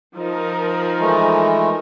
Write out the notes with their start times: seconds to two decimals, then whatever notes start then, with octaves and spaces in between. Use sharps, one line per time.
0.16 F3 D#4 A#4
1.00 E3 G#3 A3